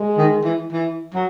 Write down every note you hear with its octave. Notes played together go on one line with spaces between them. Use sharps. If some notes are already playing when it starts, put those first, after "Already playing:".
Already playing: G#3
D#3
E3
E3
F#3